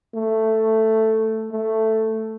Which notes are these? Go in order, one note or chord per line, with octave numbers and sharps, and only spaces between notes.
A3
A3